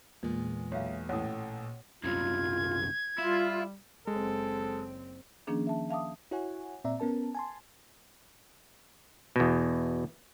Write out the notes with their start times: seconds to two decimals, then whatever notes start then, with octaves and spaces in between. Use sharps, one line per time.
0.23 E2 A#2 G#3
0.72 B1 C#5 E5 F5
1.09 A1 A2 C#5 F#5 D#6
2.04 C2 F#2 F4 G#6
3.19 G3 E4 F4
4.07 F#1 G#3 C4 A4
5.47 D#3 F3 A#3 C#4 D4 G#4
5.67 E5 A5
5.90 E5 F5 A5 D6 D#6
6.31 E4 F#4 C#5 F#5 G#5
6.84 A#2 C4 D5 E5 A#5
7.00 B3 C#4 A#4 A5
7.35 G#5 A5 C6
9.36 E2 B2